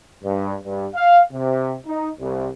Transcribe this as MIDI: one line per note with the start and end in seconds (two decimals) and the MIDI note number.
0.23 0.54 43
0.63 0.86 43
0.94 1.21 77
1.32 1.76 48
1.86 2.09 63
2.19 2.48 36